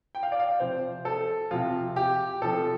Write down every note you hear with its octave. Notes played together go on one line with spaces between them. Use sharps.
G5
F5
D5
F5
C3 F3 C5
A4
C3 F3 F4
G4
C3 F3 A4